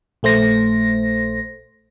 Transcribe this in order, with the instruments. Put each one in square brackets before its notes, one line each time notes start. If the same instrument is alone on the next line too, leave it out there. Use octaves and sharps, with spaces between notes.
[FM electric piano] A#1 A3 C5 A#6